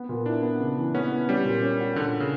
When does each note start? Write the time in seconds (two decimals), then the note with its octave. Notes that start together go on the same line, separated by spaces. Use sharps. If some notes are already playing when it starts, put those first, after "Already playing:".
Already playing: B3
0.09 A#2
0.26 D4 E4
0.42 B3
0.60 C#3
0.77 E3
0.95 B3 C#4
1.12 B3
1.28 G3 C#4
1.45 A#2
1.62 C#4
1.80 F#4
1.96 A#2 D3
2.20 C#3